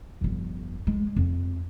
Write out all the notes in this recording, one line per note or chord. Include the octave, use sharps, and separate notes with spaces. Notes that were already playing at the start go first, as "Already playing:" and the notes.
G1 F2
G#3
F2